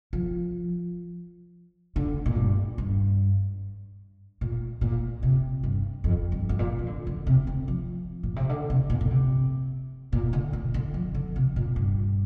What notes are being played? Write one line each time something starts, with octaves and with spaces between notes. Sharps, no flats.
F3
D3
A#2
G2
G2
A#2
A#2
C3
G2
F2
G2
G2
A#2
F3
D3
D3
C3
D3
F3
A#2
C3
D3
C3
A#2
D3
C3
A#2
D3
A#2
D3
F3
D3
C3
A#2
G2